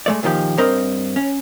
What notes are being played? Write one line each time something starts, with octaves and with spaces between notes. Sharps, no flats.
G#3 A3 D5
A#2 D#3 F3 G4
G2 C4 A#4 C5 D#5
C#4